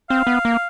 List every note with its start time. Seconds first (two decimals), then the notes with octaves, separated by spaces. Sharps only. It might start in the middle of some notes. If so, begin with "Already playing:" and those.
0.10 C4 F5
0.27 B3
0.45 A#3